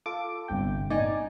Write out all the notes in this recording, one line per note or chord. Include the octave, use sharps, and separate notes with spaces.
F4 A4 D6
G1 C3 G5
D#4 D5 G#5